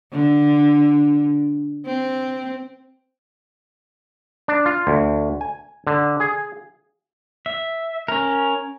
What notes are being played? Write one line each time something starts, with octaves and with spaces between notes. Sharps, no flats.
D3
C4
D4
F4
D2
G#5
D3
G#4
E5
C#4 A#4